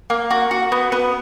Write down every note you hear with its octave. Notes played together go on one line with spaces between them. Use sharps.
A#3
F#4
F#4
B3
B3